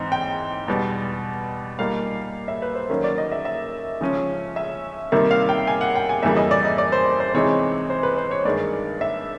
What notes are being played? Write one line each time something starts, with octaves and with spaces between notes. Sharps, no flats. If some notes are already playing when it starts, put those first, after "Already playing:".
Already playing: G#2 E3 C4 D#4
G5
E2 B2 G3
A#2 G3 A#3 D#4 F5
E5
B4
C5
D#3 F#3 A#3 C#4
D5
D#5
E5
E5
C#3 F3 G#3 C#4
E5
C3 D#3 G3 A#3 E5
F5
G5
G#5
F#5
G5
G#5
F2 C#3 E3 G3 A#3 E5
D#5
D5
D#5
D5
C5
C5
C3 E3 G#3 C4 D#4 C#5
C5
B4
C5
C#5
G2 D#3 G#3 D5
E5